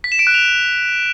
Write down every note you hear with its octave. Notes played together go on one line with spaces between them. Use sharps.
B6
E7
D7
F#6
F7